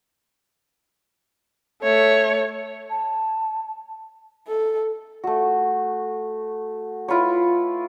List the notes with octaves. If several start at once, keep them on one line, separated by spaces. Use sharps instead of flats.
A3 C#5
A5
A4
A3 F#4
E4 F4 B4 C#5